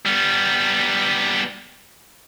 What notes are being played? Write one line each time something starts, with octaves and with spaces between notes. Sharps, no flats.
G3 B3